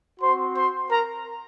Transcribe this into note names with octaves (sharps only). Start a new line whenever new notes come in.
C4 F#4 C5 C6
C5 C6
A#4 A#5